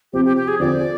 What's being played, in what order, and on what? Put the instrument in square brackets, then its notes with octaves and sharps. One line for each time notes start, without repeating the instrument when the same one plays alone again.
[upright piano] C3 F3 C4 [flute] G4
[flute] G4
G4
G#4
[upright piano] D3 F3 C4 F4 [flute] D5